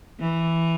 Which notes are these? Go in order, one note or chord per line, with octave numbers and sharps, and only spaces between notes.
E3